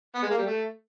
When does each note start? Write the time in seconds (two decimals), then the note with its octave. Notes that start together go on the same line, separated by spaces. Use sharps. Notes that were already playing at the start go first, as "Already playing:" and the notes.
0.15 B3
0.23 G#3
0.30 A#3
0.38 G3
0.46 A3